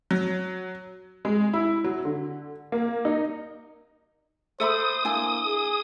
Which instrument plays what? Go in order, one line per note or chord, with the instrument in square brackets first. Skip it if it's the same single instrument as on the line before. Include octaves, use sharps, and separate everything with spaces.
[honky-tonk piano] F#3
G#3
E4
F#3
D3
A#3
D#4
[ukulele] A4 E5 B5 [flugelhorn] C5 [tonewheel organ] D#6
[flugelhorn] A#3 [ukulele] D4 E4 G#5
[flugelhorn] G#4